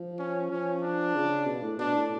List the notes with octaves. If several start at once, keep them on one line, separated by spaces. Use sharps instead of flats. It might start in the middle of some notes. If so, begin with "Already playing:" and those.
Already playing: F3
C#4
F3 C#4
D4
C#3
B2
A2
B2 D4
A2